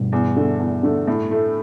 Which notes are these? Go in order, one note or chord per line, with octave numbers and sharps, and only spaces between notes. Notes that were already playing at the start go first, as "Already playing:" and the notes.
Already playing: G2 B2
E2
D3 A3
E2
D3 A3
A2
A3 E4